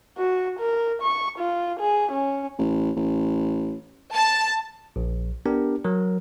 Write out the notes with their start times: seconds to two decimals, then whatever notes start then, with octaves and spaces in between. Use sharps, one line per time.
0.18 F#4
0.59 A#4
1.02 C#6
1.39 F4
1.80 G#4
2.12 C#4
2.58 A1
2.96 A1
4.14 A5
4.96 A#1
5.46 B3 D4 G4 A#4
5.85 F#3 A#4